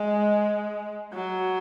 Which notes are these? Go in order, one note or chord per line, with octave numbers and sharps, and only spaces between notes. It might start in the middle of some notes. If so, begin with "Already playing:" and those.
Already playing: G#3
F#3